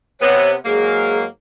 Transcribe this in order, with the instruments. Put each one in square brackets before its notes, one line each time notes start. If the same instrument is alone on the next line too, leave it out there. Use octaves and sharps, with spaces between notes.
[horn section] C3 B3 [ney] C#5
[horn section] G#2 F#3 A#3 [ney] G#4